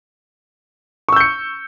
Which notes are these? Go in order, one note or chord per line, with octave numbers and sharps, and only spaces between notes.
C#6 E6 G6 C#7